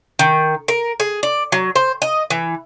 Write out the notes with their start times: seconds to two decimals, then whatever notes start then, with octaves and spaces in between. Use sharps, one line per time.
0.19 D#3
0.68 A#4
1.00 G#4
1.23 D5
1.52 F#3
1.76 C5
2.02 D#5
2.30 E3